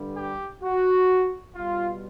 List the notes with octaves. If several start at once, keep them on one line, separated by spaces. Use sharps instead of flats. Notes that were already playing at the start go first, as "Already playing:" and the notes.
Already playing: G2 D3 G3
G4
F#4
B2 G3 F4